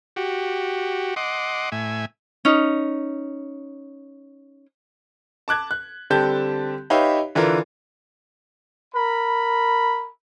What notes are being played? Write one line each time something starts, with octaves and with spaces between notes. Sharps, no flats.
F#4 G4
D#5 F#5 C6 D6
A2 E5 G#5
C#4 D#4
A5 D6 F#6 G#6
F#6
D3 G3 C4 G4 A5 G6
D#4 G4 B4 C#5 E5 F5
D3 E3 D4 F4 A#4
A#4 B5